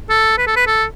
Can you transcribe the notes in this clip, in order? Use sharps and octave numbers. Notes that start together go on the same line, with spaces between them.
A4
B4
A4
B4
A4